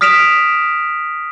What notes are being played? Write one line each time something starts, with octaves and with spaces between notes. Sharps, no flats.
D#6 F6 B6 D7 E7 F7